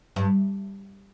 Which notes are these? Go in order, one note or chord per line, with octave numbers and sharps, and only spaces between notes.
G2